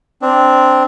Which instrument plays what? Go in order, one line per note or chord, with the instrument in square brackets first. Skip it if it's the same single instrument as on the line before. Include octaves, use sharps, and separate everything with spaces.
[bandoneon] C4 D4